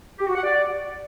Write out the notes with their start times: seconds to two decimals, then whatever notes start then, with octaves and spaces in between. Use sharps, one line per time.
0.18 G4
0.26 F#4
0.35 F#5
0.44 D5